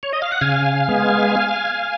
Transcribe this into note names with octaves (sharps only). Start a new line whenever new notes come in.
C#5
D#5
F5
F#5
C#3 F5 G#5
G#3 B3